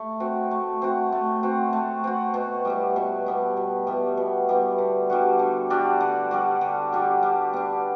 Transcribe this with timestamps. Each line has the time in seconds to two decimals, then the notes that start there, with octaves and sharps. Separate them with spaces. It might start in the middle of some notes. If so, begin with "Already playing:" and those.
Already playing: A3
0.20 C4 F#4
0.51 A3
0.82 C4 F#4
1.12 A3
1.43 C4 F#4
1.73 A3
2.04 C4 F#4
2.34 B2
2.65 G3 B3 E4
2.96 B2
3.26 G3 B3 E4
3.57 B2
3.87 G3 B3 E4
4.17 B2
4.49 G3 B3 E4
4.78 D3
5.10 G3 D4 F#4
5.39 D3
5.70 G3 D4 F#4
6.00 D3
6.31 G3 D4 F#4
6.61 D3
6.92 G3 D4 F#4
7.23 G3
7.53 B3 D4